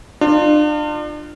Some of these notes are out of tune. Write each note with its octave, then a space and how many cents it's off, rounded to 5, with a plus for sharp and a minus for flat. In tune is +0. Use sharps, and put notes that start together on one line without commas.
D4 +40 F4 +0